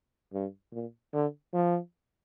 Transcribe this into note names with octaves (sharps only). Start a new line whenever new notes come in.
G2
A#2
D3
F3